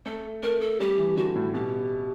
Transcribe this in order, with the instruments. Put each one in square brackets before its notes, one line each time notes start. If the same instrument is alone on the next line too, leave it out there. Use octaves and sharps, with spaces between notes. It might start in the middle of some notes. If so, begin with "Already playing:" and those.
[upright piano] A3 [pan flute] A4
[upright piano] A3 [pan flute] A#4
[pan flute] A4
[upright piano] G3 [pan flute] G4
[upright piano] E3
[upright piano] D3 [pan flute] F#4
[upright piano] A2
[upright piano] B2 [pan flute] G4